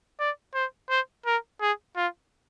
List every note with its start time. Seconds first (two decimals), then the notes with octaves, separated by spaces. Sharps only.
0.20 D5
0.54 C5
0.90 C5
1.26 A#4
1.61 G#4
1.96 F4